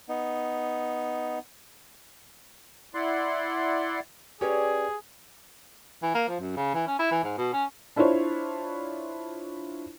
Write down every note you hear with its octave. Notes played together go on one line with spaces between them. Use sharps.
B3 D#4
E4 D5 F#5 C6
C#4 G4 G#4 B4 C#5 D5
E3
A#3
F3
F#2
C#3
E3
C#4
E4
E3
G#2
B2
C#4
D4 E4 F4 C5 C#5